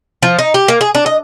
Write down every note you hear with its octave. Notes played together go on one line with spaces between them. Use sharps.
F3
D#4
G4
A#3
G#4
D4
D#5